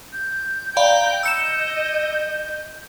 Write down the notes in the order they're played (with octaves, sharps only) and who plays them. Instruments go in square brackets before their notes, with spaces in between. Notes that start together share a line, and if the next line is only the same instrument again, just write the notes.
[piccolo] G6
[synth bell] D5 F5 B5 [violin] G5 A#5
[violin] D#5 [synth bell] E6 C#7 E7